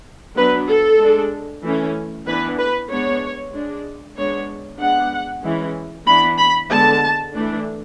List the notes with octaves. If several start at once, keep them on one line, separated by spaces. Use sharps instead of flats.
F#3 B3 D4 B4
A4
G#3 D4
E3 A3 C#4
E3 B3 D4 B4
B4
G#3 B3 D4 C#5
G#3 D4
G#3 B3 D4 C#5
G#3 B3 D4 F#5
E3 G#3 C#4
E3 B3 D4 B5
B5
D3 G#3 B3 A5
E3 A3 D4